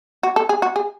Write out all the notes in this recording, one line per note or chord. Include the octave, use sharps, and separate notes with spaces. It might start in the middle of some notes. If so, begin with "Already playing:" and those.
F#4
A4
G#4
F#4
G#4